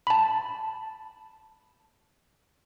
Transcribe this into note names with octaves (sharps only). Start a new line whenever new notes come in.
A5 B5